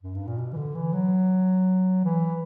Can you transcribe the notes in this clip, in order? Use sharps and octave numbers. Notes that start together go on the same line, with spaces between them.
F#2
G2
A#2
B2
E3
D3
E3
F#3
E3